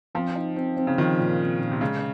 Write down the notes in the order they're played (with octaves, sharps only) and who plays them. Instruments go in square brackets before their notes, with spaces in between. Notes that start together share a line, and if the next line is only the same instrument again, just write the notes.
[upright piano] F3 [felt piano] C4
[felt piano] D#4
C4
C4
[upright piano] C#3
[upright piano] D#3 [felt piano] F3
[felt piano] A#2
C4
A#2
[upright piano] C3
[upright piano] C#3 [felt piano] G#3